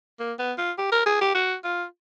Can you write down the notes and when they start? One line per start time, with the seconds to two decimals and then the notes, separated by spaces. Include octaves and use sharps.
0.20 A#3
0.39 B3
0.58 F4
0.78 G4
0.92 A#4
1.06 G#4
1.21 G4
1.35 F#4
1.64 F4